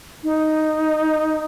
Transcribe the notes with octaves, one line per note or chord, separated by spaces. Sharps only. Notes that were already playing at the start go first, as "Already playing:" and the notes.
D#4